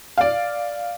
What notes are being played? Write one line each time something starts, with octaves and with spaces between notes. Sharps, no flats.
D5 F5